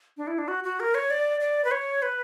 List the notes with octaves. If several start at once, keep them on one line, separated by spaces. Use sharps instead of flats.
D4
E4
D4
F#4
F#4
A#4
C#5
D5
D5
B4
C#5
B4